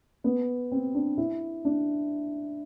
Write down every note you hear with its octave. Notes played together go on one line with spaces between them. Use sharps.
B3
C4
D4
E4
D4